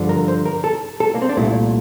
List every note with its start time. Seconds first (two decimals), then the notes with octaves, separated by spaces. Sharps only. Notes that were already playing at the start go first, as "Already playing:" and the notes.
Already playing: G2 D3 F3
0.09 A#4
0.28 C5
0.46 A#4
0.64 A4
1.00 A4
1.15 A#3
1.22 C4
1.29 D4
1.37 C2 A#2 A3 E4